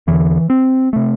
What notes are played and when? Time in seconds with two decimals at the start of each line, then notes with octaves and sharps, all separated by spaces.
0.07 E2 D3 E3
0.50 C4
0.93 C3 A3